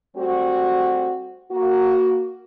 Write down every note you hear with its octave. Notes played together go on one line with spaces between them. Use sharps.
G3 A3 C4 F#4
A#3 F#4